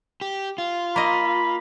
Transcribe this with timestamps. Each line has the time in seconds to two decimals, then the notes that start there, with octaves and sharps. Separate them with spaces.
0.21 G4
0.58 F4
0.96 A#3 D#5 B5